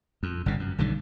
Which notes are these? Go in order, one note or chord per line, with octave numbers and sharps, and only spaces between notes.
F2
G1 G2 C#3
F#2
B1 D3 D#3 G3